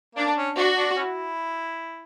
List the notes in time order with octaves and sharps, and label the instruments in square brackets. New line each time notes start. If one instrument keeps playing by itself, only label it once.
[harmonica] A#3 [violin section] D4
[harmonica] C#4
[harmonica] D4 [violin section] F#4
[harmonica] D4
C#4 E4